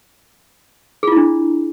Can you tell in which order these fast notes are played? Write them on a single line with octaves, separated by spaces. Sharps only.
G#4 F4 E4 D4